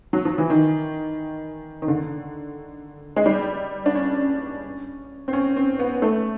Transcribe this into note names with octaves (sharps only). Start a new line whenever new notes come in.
F#3
F3
E3
D#3
D#3
D3
G#3
G3
D4
C#4
C4
C#4
C4
B3
A3